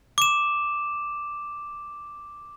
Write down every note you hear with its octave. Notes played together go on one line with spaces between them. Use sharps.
D6 E7